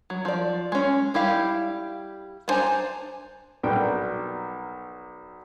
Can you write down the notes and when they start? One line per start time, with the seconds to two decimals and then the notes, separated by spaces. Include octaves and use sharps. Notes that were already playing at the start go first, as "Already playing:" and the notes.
0.10 F#3
0.25 F3 D5
0.72 G#3 C#4
1.14 G3 E4 G4 F5
2.48 B3 D4 C5 G#5 A#5
3.63 B1 G3 D4 A#4 G5